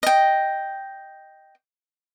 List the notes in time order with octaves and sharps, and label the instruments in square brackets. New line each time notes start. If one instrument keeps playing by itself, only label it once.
[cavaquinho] D#5 G5